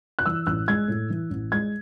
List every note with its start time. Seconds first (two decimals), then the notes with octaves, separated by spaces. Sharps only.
0.19 F#6
0.25 E3 E6
0.47 A1 F#6
0.68 G#3 G#6
0.88 A2
1.10 E3
1.30 A1
1.52 G#3 G#6